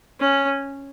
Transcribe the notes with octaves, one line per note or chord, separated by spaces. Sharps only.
C#4